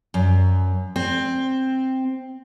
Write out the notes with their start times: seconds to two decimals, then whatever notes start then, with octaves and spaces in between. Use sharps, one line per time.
0.14 F#2
0.96 C4